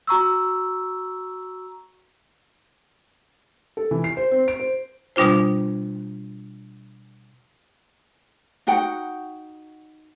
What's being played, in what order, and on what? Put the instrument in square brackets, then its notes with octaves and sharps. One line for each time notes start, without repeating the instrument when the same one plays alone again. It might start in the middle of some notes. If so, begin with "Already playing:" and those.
[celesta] F#4 A#5 C#6 E6
[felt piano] A4
E3
C7
C5
C4
D7
C5
[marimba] B2 G3 D4 F4 C5
[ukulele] D#4 F#4 F#5 G5